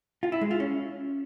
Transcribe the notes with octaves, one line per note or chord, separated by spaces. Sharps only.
F4
E4
G#3
F4
C#4